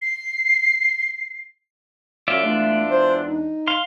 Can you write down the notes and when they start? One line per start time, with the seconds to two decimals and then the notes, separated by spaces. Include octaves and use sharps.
0.02 C7
2.28 F#2 F4 C#5 D5 E5 F5
2.43 E2 G#3 A3 D4
2.91 C5
3.27 D#4
3.67 F5 C6